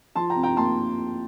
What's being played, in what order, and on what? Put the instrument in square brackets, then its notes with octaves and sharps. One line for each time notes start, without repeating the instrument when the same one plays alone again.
[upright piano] F3 A5 C6
G5 A#5
C3
G5 A#5
A#3 A5 C6